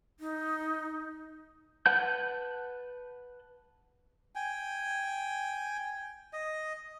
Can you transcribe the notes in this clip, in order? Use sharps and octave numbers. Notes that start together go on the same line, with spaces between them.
D#4
B4 F#5 A5 G6
G5 G#5
D#5